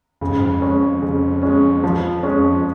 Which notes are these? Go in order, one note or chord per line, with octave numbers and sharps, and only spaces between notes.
F2 C#3
G#2
F2
G#3 C#4
C#3
G#3 C#4
F3
G#3 C#4